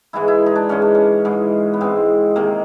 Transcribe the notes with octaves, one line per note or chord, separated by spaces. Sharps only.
G#2 E3 G#3 E4
E4
D#4
D4
G#2 E3 G#3 C#4
D4
C#4
G#2 E3 G#3
B3
G#2 E3 G#3 C4
C3 D#3 G#3 A#3